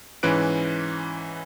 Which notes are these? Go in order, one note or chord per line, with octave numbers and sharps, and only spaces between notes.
G#2 E3 C#4 B4 F#6 D7